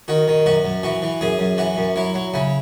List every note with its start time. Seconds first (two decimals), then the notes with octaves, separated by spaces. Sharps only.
0.08 D#3 F#4
0.28 D#3
0.46 F#2 F#4
0.65 F#2
0.83 E3 F#4
1.02 E3
1.21 F#2 G#4
1.39 F#2
1.58 E3 F#4
1.77 F#2
1.96 F#3 E4
2.14 F#3
2.34 C#3 E4